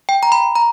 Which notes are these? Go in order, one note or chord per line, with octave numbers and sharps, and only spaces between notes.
G5
A#5
B5
A#5